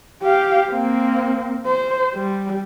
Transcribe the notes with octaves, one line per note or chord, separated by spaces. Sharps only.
G4 F5
A#3 C4
C5
G3